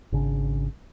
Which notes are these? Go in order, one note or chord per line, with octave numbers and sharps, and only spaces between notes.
G#1 C#3 D4